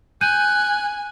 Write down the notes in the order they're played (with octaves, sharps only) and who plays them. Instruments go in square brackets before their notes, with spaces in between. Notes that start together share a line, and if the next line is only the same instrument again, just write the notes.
[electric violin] G#5 [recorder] F#6 [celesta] G6 D#7